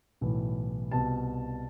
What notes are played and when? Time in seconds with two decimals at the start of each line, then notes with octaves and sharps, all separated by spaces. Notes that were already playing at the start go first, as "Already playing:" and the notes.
0.21 B1 A2 E3
0.91 C2 B2 A5